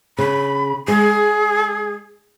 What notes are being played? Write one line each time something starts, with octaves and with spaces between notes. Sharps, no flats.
C#3 B5
G#3 G#4